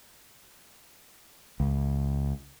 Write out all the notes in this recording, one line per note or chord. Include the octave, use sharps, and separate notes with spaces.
C#2